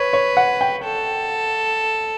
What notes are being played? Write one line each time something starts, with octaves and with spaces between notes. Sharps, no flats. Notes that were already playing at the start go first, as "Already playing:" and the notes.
Already playing: B4 C#5
C#5
F#5
G5
A4